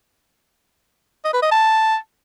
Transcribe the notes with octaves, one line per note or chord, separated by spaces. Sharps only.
D#5
B4
D#5
A5